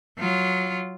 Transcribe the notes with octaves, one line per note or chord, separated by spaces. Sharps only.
F#3 F4